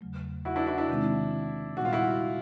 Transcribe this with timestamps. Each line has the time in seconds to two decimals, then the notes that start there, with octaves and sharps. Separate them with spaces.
0.01 E2 C#3 F#3 A3
0.45 E4 F#4
0.56 D4 E4
0.67 E4 F#4
0.78 D4 E4
0.88 C3 D#3 G#3 C4 D#4
1.76 A#2 G3 B3 D#4 F#4
1.85 F4
1.93 E4 F#4